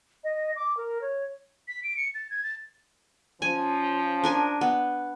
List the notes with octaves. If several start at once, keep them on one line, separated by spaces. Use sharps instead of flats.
D#5
D6
A#4
C#5
B6
D7
C#7
A6
G#6
A6
F3 C#4 G#5
D4 A#4 G#5
B3